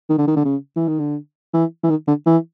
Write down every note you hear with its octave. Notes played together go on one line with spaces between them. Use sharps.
D#3
D3
D#3
D3
C#3
E3
D#3
D3
E3
E3
D#3
D3
E3